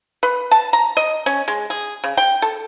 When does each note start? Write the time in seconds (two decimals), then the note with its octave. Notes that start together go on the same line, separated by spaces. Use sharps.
0.23 B4
0.52 A5
0.73 A#5
0.97 D#5
1.26 C#4
1.48 G#3
1.70 G#4
2.04 C#3
2.17 G5
2.42 A4